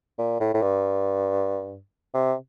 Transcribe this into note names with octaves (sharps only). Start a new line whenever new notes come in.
A#2
A2
A2
G2
C3